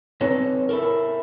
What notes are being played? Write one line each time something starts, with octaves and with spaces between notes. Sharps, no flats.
C4 D#4 A4 B4 C#5
E4 A4 A#4